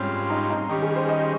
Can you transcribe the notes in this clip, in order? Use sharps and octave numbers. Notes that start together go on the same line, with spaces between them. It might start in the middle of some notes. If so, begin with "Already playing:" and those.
Already playing: G#2 G3 C4 C#4 F4
D#4
D#4
D#3 G3 C#4 G4
G#4
C5
D#5